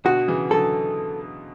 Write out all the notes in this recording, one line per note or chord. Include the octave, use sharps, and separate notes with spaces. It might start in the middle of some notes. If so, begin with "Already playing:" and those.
B2 D3 F#4
C#3 E3
D3 F#3 A4